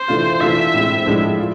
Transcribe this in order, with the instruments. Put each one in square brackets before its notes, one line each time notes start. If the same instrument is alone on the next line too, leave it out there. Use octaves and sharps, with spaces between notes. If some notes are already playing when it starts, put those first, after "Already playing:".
Already playing: [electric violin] C5
[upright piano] E3 A3 D4 F4
[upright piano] E3 A3 D4 F4 [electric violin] E5
[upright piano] A2 G#3 C4
A2 F3 G#3 D4
F4